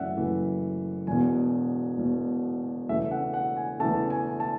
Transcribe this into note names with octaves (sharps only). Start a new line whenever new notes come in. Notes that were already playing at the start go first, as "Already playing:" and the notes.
Already playing: F#1 F#2 E3 A3 D5 E5 F#5
F#1 F#2 E3 A3
E1 E2 B2 G#5
E1 E2 B2
E1 E2 C#3 E3 A3 E5
F#5
F#5
G#5
E1 E2 C#3 E3 A3 A5
G#5
A5